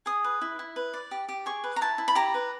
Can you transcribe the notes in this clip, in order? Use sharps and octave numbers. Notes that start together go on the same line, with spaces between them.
G#4 D#6
B4
E4
E4
B4
D5
G4
G4
G#4 C#6
B4
A#5
E4 A5
E4
B5
G4 A#5
B4